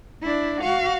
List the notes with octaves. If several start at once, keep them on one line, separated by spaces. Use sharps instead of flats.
D4 E4
F#4 F5